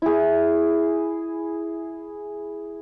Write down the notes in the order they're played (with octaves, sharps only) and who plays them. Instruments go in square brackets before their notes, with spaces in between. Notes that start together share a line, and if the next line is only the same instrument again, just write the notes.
[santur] E4 G#4